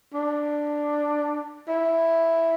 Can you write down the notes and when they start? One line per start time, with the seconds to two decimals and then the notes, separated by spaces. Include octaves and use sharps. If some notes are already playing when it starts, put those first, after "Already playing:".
0.14 D4
1.68 E4